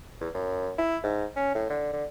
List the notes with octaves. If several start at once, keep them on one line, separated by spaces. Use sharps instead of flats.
E2
F#2
E4
G#2
C#4
A2
D3
D3